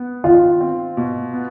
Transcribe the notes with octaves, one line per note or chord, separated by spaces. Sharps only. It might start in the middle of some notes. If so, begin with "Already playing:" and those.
Already playing: B3
D#3 F4
C4
B2
B3